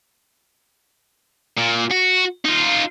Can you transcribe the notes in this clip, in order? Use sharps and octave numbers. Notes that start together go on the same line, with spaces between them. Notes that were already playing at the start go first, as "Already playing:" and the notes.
A#2
F#4
D#4 F4